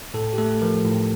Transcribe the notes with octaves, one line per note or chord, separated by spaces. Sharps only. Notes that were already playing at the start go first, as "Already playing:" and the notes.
A2 A4
G4
A3 A4
F3 A#4
A2